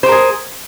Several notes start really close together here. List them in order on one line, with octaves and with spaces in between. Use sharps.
C5 G4 A#4 G#4